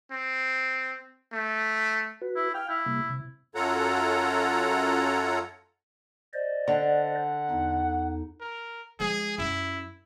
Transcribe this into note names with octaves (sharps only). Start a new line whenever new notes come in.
C4
A3
F#4 B4
E4
F5 G5 F6
E4
C3 G3 A#3
C3
F#2 F4 A4 C#5 F#5 A#5
C5 D5 D#5
D3 F#5
E2 D#4
A#4
F3 G#3 G#4
F#2 E4